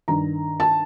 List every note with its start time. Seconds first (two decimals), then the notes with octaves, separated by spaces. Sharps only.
0.08 G2 D#3 A#5
0.60 A5